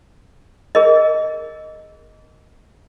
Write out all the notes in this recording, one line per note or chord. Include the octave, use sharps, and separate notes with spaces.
G#4 A#4 D#5